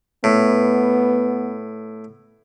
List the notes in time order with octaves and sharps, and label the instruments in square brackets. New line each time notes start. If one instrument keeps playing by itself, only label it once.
[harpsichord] A2 [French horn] B3